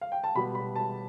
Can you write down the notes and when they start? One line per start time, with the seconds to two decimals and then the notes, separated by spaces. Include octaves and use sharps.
0.01 F5
0.12 G5
0.24 A5
0.35 B2 G3 B3 B5
0.55 B5
0.76 A5